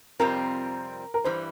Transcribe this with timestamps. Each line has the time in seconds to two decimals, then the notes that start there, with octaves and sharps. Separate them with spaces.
0.19 F2 C3 G3 C4 F4 A#4
1.14 A#4
1.25 G2 E3 G3 C5